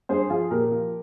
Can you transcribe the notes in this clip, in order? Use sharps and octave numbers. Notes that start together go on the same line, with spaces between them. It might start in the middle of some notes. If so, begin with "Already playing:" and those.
G2 G#4 C5
F3 F4 G#4
A#2 G4 A#4
F3